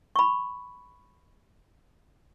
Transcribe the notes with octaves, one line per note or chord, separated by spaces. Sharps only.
B5 C#6